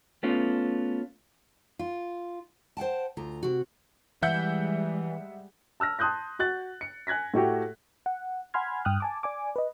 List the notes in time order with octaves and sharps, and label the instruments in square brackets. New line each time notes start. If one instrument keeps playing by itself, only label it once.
[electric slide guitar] A3 B3 C#4 F4
[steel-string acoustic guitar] F4
C5 F#5 G5 A5
D2 F4 A#5
C3 F#4
[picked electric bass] E3 [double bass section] G3 G#3 [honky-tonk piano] E5 F#5 G6
[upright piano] A5 E6 F6 A#6
A5 C6 D#6 F#6 G6 A#6
F#4 F#6 A6
C#7
G#5 F#6 G#6 A#6 B6
A2 A3 F#4 G4
[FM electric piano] F#5
F#5 G#5 B5 C6 F6 G#6
G2 G5 D#6 F6 F#6
G#5 A5 D6
D5 G#5 D6
B4 D#5